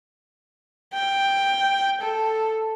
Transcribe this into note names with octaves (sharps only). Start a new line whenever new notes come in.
G5
A4